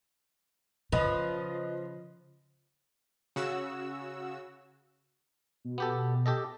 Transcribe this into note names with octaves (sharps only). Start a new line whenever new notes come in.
C#3 F3 B4 D#5
C#3 F#4 E6
B2
B3 G4 A4
G4 A4 D#5